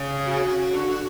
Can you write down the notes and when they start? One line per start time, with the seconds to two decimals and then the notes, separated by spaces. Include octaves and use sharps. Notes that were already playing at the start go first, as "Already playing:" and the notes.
Already playing: C#3
0.26 F#4
0.72 D3
0.88 D3